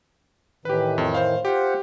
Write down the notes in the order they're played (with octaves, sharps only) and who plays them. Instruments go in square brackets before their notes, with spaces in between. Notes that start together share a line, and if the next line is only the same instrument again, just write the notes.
[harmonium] A2 D#3 E3 [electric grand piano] G4 B4
[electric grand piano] F2
C5 F5
[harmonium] F4 C5 F#5 [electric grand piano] G4